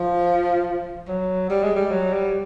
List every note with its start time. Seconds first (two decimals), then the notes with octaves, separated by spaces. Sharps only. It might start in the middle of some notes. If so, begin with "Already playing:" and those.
Already playing: F3
1.08 F#3
1.50 G3
1.64 G#3
1.76 G3
1.91 F#3
2.13 G3